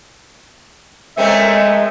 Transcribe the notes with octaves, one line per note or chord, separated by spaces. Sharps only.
G#3 A3 C4 C#4 A#4 D#5 E5